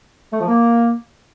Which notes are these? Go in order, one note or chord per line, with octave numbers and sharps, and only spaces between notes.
A3
F3
A#3